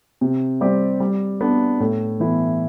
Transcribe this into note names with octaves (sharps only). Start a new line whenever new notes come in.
C3
G3 C4 G4 D5
G3
B3 D4
A2
E3 B3 E4